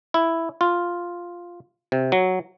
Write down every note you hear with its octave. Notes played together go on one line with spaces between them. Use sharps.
E4
F4
C3
F#3